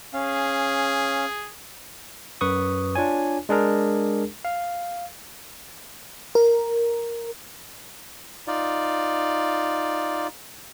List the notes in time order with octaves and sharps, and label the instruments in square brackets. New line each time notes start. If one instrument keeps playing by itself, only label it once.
[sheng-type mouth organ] C#4 F5 [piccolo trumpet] G#4
[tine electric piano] F#2 B4 C#6 D#6
D4 F4 C#5 G#5
G#3 D4 G#4 A#4
F5
[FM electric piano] A#4
[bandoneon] D#4 F4 D5